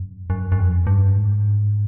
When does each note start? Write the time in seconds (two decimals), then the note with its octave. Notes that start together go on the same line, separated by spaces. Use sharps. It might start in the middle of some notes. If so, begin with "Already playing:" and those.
Already playing: F#2
0.30 F#2
0.52 F#2
0.59 F2
0.87 G2
1.16 G#2